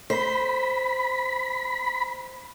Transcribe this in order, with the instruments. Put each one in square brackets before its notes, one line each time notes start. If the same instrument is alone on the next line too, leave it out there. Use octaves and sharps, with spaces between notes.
[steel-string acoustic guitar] C5 [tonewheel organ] B5